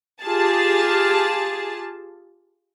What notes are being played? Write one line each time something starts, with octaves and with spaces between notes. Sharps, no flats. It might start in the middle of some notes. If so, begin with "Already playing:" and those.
F4 G4 G#4 A5